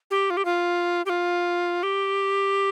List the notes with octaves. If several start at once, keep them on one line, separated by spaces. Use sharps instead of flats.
G4
F4
G4
F4
G4
F4
G4